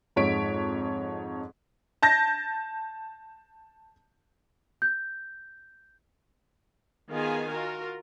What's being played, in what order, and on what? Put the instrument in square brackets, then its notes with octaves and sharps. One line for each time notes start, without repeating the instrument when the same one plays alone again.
[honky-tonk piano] F2 G#2 C#5 B6 D7
A5 G6 A#6
[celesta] G6
[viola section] D#3 B3 F4 G#4 F5 G#5
F4 F#4 A#4